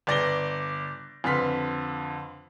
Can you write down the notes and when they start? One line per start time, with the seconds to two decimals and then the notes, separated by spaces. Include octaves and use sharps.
0.07 G1 D5 A#6 G7
1.24 F2 D3 B4 C6 F6 B6